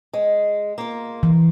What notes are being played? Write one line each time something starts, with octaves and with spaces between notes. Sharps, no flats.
G#3
A#3 F4
E3